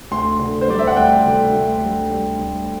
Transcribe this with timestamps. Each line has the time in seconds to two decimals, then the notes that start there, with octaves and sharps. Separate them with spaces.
0.11 D2 C6
0.39 D3
0.61 C5
0.68 G3 D5
0.79 E5
0.87 F#5
0.96 D2 G5
1.25 D3
1.53 D2
1.82 G3
2.10 G3
2.38 D2